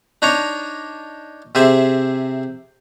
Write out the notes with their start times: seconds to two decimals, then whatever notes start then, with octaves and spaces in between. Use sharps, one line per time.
0.22 D4 D#4 C#5 D#5 A#5
1.55 C3 G#4 C5 E5